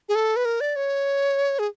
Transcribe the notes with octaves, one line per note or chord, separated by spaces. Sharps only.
G#4
A4
B4
A#4
D5
C#5
G#4